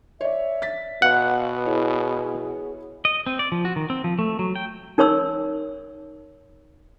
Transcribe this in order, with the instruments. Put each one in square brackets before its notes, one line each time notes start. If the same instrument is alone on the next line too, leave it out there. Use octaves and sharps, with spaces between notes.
[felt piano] C#5 D5 [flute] E5
[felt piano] A6 B6
[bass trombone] B2 [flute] B4 [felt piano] F5 [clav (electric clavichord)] F#5
[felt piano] E4 C#5 [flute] G#4
[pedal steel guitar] D#5
C4
D5
F3
F#4
D#3
C4
F3
A3
F#3
G5
[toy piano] D#4 A#4 C#5 C6 E6